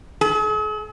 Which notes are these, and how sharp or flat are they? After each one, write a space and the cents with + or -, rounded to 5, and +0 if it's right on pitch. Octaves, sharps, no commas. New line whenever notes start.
G#4 +45